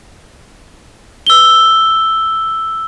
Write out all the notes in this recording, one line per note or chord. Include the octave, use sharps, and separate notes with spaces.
E6 G7